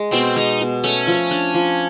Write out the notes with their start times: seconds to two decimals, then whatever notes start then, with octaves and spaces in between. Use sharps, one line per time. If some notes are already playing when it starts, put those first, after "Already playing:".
Already playing: G#3
0.12 B2 C4
0.36 G#3 D#4
0.61 B2
0.84 A3 C#4
1.07 F3
1.31 D4
1.54 F3